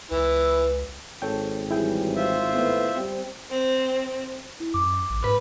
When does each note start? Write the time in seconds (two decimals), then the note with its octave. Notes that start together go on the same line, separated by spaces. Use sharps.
0.11 C#2 E3 E4 B4
1.22 G#1 A4 C#5 G5
1.71 E3 F#3 G3 E4 G#4 G5
2.16 F4 C5 E5
2.52 A2 B3
2.94 G3 C4
3.50 C4
4.60 E4
4.74 F#2 D6
5.10 A1
5.24 G#2 B4